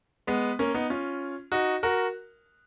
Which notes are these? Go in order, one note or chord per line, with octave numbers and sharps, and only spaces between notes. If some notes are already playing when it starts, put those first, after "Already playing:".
G#3 B3
A#3 C#4
B3 D#4
C#4 F4
D#4 F#4
F#4 A#4